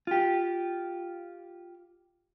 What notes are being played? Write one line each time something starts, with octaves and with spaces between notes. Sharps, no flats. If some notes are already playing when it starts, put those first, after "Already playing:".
F4 G4